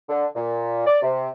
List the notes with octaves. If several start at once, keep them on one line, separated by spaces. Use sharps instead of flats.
D3
A#2
D5
C3